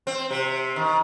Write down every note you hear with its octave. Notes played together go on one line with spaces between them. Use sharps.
C4
C3
D#3